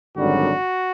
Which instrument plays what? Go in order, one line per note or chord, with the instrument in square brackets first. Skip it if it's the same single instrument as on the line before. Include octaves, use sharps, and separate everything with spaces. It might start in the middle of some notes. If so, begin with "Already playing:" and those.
[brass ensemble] G#1 F#2 D3 G3 F#4